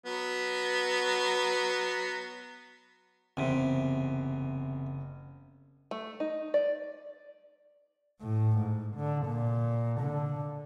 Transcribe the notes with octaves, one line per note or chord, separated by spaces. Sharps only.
F#3 B3
F#1 E2 C3
A3
D#4
D5
A2
G#2
D3
A#2
D3